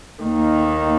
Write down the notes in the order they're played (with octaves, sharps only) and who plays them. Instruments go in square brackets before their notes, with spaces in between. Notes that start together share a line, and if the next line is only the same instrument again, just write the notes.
[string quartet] D#2 D#3 A#3